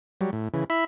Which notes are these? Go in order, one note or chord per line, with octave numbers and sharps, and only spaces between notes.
F#3 G3
A2
C#3 E3
E4 E5 B5